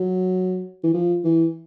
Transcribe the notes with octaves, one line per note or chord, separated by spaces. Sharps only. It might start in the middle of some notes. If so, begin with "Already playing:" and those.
Already playing: F#3
E3
F3
E3